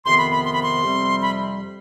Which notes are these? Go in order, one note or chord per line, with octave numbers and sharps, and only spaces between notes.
F2 C3 D#3 B3 C6
B5
B5
C6
B5
C6
F2 C3 G3 C4
B5